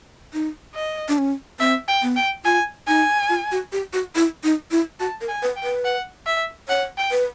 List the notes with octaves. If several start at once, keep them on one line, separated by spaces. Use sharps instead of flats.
D#4
D#5
D4
C#4
C4 E5
G5
B3
G5
F4 G#5
D#4 G#5
F4
F#4
G4
F#4
E4
D#4
E4
F#4 A5
A#4
G#5
B4
G5
B4
F#5
E5
C#5 F#5
G5
B4